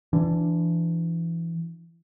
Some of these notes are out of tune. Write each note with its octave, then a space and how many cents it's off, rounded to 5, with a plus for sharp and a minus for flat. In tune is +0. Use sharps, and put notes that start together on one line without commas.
E3 +25 D4 +0